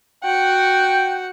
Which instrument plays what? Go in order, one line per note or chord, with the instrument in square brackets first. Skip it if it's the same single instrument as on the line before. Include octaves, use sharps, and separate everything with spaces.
[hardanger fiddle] F#4 F#5 [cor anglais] G5